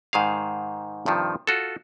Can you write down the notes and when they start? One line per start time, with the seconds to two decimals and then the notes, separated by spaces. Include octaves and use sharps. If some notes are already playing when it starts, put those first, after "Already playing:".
0.13 G#2 D#3 G#4 F5
1.06 G2 C3 D#3 F3
1.47 F4 F#4 A4